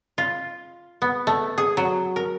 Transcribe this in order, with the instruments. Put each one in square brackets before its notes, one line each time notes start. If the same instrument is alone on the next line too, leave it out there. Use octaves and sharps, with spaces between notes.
[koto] F4
B3
A3
G#4
F#3
A#4